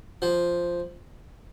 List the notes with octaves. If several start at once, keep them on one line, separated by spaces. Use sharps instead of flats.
F3